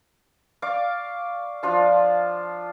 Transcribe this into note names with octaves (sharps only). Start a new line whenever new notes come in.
D5 F5 C#6 D6
F3 D4 F4 A5